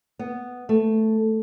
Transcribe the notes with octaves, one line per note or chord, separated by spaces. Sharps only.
B3
A3